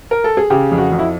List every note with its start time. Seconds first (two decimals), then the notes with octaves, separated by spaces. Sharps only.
0.11 A#4
0.24 A4
0.37 G#4
0.50 C#3 G4
0.71 F2
0.78 F#4
0.92 F2
0.99 E4